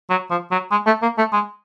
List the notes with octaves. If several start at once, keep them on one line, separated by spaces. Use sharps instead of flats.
F#3
F3
F#3
G#3
A3
A#3
A3
G#3